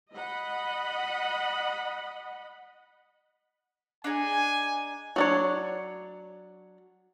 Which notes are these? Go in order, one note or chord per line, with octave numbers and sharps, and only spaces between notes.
D#5 F#5 B5
D4 D#4 G#4 G#5
F#3 D4 C#5